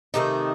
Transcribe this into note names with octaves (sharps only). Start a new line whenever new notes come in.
C3 D#3 A3 D#4